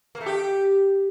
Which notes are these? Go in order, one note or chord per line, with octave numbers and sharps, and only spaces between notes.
A#3
A3
G4